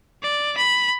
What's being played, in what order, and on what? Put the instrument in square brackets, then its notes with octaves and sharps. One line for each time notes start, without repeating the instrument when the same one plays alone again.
[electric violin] D5
B5